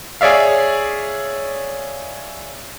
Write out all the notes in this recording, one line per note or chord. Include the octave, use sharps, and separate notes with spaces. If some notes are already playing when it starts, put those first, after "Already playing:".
G#4 C#5 D5 E5 F5